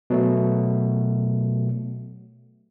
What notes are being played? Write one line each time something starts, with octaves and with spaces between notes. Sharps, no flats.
B2 F#3 A3